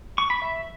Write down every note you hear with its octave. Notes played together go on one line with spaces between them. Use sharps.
C#6
B5
E5